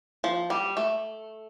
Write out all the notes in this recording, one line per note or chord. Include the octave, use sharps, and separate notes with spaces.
F3
G3
A3